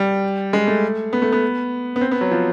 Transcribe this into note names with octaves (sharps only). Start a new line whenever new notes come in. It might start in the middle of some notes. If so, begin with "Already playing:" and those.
Already playing: G3
G#3
A3
B3
A3
B3
B3
C4
B3
F#3
F3